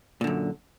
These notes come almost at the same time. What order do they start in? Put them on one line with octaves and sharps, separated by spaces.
A#2 D3 F#2